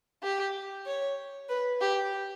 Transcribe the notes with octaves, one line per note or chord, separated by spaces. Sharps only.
G4
C#5
B4
G4